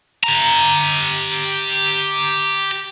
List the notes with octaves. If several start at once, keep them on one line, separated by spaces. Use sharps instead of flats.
G4 A#5